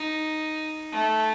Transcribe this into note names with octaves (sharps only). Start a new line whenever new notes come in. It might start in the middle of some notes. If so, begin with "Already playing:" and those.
Already playing: D#4
A3